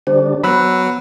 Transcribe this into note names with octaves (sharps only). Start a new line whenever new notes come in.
D3 G3 D4 C5
F#3 B3 B5 E6 F#6